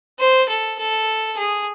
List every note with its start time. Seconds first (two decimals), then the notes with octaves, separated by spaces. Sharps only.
0.20 C5
0.49 A4
0.79 A4
1.38 G#4